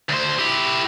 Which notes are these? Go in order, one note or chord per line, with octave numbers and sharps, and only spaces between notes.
D2 C5
E4 G4